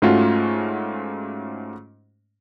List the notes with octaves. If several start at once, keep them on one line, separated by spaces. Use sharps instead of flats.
G#2 A3 C#4 F4 F#4